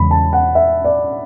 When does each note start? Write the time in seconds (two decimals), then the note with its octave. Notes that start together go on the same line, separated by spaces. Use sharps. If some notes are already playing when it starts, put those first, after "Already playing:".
Already playing: E2 C#3 G#3 B5
0.11 A5
0.33 F#5
0.55 E5
0.84 D5